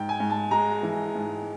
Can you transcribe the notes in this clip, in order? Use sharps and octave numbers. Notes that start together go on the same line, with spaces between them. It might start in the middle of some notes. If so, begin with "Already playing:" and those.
Already playing: G#2 G5
G#5
G#2
A5
G#3 A#5
E3
G#2